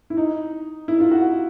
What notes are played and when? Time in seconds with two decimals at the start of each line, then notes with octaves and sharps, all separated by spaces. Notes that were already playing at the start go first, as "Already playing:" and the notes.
0.10 E4
0.17 D#4
0.88 E4
1.00 F4
1.11 F#4